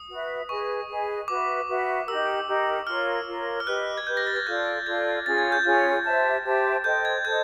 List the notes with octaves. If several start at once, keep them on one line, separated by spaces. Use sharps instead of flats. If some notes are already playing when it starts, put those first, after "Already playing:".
Already playing: D#6
F#4 B4 E5
G#4 B4 D#5 G#5 C#6
G#4 B4 D#5 G#5
F#4 B4 E5 D6
F#4 B4 E5
D#4 G4 A#4 E6
D#4 G4 A#4
F4 A#4 C#5 F6
F4 A#4 C#5
F6
G4 B4 D#5 F#6
G#6
G4 B4 D#5 G6
A#6
A6
G#6
F4 A4 D5 F5 G6
F4 A4 D5 F5 G#6
C#4 F4 G#4 C#5 A6
G#6
G6
C#4 F4 G#4 C#5 G6
G4 C5 E5 A5
G4 C5 E5 A5
A4 C5 D#5 G5 G6
G#6
A4 C5 D#5 G6